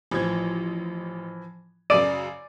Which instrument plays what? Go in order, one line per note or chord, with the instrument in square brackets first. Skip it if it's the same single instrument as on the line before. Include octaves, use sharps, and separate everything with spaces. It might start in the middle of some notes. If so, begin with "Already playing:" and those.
[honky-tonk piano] A1 G#6 [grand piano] E3 F3
[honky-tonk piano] F#2 C#3 A6 [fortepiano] D5 [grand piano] E6 D#7